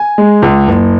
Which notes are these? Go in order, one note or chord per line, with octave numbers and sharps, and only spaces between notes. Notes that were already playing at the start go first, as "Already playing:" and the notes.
Already playing: G#5
G#3
C#2
F#1